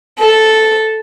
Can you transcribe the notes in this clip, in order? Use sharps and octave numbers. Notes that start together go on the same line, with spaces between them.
A4